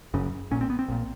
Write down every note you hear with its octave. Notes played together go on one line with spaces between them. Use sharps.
F#1 F#2 C#3
A#1 A#2 C#4
C4
B3
C4
A#1 A#2